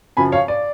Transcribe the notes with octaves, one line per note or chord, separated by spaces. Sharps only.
F#2 C#3 F3 G#5 B5
C#5 F5
D5